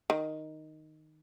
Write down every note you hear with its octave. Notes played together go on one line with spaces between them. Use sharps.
D#3